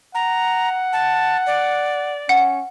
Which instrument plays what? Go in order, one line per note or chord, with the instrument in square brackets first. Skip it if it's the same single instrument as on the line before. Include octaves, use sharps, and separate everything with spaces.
[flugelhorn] F#5 [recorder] A#5
[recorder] A5
D5
[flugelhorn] C#4 [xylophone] F#5